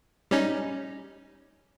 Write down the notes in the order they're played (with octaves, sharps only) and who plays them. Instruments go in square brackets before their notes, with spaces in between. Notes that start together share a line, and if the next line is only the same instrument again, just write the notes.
[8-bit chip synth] G3 C#4 D#4